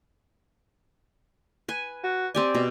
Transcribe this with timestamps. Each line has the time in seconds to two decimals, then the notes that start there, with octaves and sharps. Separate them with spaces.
1.68 B4 G#5
2.03 F#4
2.35 C4 G4 D5 G#5
2.55 B2